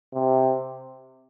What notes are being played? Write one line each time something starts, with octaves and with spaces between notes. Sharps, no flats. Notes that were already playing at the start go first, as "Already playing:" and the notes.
C3